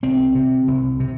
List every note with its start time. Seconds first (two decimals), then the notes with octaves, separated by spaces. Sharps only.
0.03 C2 C4
0.35 C3
0.68 C2
1.00 C3